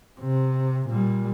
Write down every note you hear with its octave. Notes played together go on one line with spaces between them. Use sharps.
C3
A#2 G3